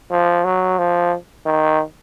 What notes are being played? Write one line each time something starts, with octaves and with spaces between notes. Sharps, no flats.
F3
F#3
F3
D#3